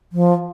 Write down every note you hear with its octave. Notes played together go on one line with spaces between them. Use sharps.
F3